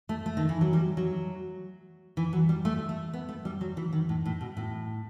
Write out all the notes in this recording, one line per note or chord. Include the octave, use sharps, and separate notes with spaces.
A3
A3
D#3
E3
F#3
G3
F#3
E3
F#3
G3
A3
A3
B3
A3
G3
F#3
E3
D#3
A2
A2
B2
A2